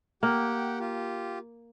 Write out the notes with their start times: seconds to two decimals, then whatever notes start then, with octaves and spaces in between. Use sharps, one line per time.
0.23 A#3 G4 F#5 G5
0.80 F4 G4